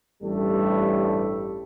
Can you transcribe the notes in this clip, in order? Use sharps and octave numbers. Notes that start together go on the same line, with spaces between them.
A1 G2 G3 A3 G4